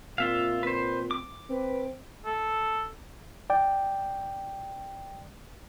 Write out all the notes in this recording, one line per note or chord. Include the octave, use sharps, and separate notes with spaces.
A#2 C4 F4 E5 F5
C4 B4 C5
D6
C4 B4
A4
D5 G5